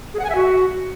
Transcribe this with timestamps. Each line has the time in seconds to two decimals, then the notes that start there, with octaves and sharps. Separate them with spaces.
0.14 G#4
0.19 F#5
0.25 G#5
0.30 E5
0.35 F#4